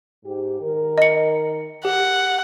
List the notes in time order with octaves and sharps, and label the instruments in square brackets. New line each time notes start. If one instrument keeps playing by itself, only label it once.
[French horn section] G#2 G4
D#3 A#4
[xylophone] D#5 C#7
[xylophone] G4 [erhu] F#5